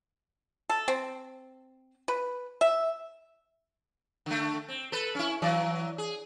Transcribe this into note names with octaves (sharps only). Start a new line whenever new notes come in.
A4
C4
B4
E5
D3 A3
C4
A4 B4
C#4 E4
E3 F#3 D5
G#4